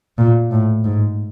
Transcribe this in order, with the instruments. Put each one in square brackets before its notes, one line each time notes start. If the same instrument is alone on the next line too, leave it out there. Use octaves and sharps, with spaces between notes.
[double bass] A#2
A2
G#2